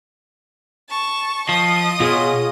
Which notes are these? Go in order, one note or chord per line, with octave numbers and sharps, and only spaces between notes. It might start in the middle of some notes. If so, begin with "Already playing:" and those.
A5 C#6
F3 D#5 D#6
B2 F4 G#4 C#5